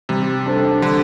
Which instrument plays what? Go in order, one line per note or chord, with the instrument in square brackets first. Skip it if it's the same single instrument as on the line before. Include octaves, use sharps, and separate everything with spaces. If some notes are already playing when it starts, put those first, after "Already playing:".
[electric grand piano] C3 [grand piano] G3
[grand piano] D4 A4 C5
[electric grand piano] D3 [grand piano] G3